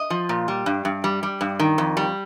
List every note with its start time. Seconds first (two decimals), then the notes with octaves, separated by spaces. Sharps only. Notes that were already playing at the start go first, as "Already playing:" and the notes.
Already playing: D#5
0.10 F3
0.29 A#2
0.48 G3
0.66 G2
0.85 G2
1.04 G3
1.23 G3
1.41 G2
1.60 D#3
1.78 F2
1.97 G3